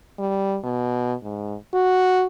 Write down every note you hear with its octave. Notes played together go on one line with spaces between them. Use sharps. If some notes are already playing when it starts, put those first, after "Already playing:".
G3
B2
G#2
F#4